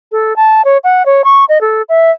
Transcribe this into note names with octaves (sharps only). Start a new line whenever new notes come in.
A4
A5
C#5
F#5
C#5
C#6
D#5
A4
E5